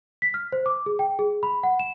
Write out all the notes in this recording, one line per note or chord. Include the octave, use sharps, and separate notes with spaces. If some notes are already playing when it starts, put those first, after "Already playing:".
B6
F6
C5
D6
G#4
G5
G#4
B5
F#5
E7